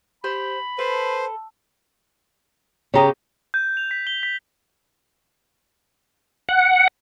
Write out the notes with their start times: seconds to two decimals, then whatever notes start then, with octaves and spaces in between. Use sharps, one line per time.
0.24 G4 C5 B5
0.79 A4 B4 C5
2.94 C#3 G4 C#5 A#5 D#6
3.54 G6
3.77 F7
3.91 B6
4.07 G7
4.23 B6
6.49 F#5